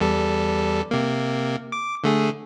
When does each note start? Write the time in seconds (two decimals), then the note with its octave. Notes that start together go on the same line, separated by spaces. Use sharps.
0.01 E2 G3 A4
0.91 C3 A#3
1.72 D6
2.04 D3 A3 G#4